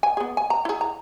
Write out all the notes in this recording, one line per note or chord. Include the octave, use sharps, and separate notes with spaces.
G#5
B3 G#4
G#5
A#5
E4 G#4
A#5